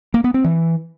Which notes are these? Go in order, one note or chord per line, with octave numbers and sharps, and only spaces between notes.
A#3
B3
C4
E3